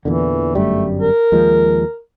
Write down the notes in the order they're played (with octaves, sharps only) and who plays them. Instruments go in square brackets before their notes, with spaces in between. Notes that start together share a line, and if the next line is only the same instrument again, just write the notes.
[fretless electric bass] E2 A#2 D3 [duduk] E3
[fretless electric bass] G1 F#2 G3 [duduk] A3
[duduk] A#4
[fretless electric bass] D#2 F3 G#3